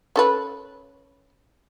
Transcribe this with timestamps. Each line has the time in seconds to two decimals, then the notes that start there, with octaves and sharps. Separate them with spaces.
0.16 C#4 A4 B4